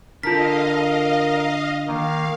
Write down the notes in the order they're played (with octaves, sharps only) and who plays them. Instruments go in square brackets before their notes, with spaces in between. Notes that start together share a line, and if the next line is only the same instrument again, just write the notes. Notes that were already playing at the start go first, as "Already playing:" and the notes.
[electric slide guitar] D3 A5 [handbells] F4 B6 [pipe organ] A#4 [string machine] D#5 F5
[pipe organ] D#3 A#3 [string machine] F5